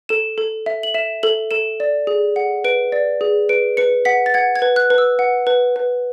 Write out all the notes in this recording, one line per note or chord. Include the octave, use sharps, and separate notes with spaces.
A4 E7
A4
E5
F#7
E5 E7
A4 F#7
A4 E7
D5
G#4
F#5
B4 D7
D5
G#4
B4 D7
B4 C#7
F#5 B6
A6
F#5 G#6
G#6
B4
F#6
B4
E6
F#5
B4
B4